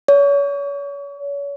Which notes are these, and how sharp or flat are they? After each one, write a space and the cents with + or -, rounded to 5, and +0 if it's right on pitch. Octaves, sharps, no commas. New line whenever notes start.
C#5 +35